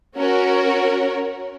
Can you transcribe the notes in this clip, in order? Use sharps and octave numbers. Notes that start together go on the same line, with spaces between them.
C#4 F#4 A#4